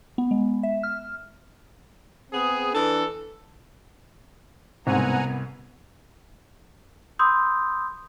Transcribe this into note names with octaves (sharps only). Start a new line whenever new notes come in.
B3
G#3
E5
F6
B3 C4 G#4
E3 D4 A4
C2 G#2 B2 B3 C4 F#5 G#5 A#5
B5 C6 D#6 E6 G6